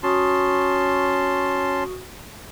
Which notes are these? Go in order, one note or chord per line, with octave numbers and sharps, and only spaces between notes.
C#4 F#4 A5 C6 C#6 D#6